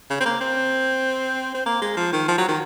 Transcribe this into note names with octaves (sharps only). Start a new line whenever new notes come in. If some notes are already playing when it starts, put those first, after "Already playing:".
C#3
C4
A#3
C4
C4
A#3
G#3
F3
D#3
F3
F#3
D#3